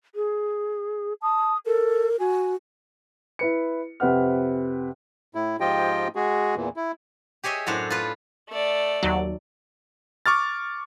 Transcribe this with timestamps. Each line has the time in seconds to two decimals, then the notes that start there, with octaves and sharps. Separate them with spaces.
0.15 G#4
1.22 A5 D#6
1.66 A4 A#4
2.19 F#4 G#5
3.39 E4 B4 C#7
4.00 F2 C3 B4 F#5 F6
5.35 A2 E4
5.60 G#2 F3 F4 G4 D#5 G5
6.15 G#3 F#4 G#4
6.56 E2 A#2 E3
6.76 E4
7.44 G4 G#4 C#5 D#5 E5
7.66 F#2 A2 D4 F#4 C5 C#5
7.90 F4 B4
8.50 A3 D5
9.03 D#2 F#3
10.26 C#6 D6 F6 A6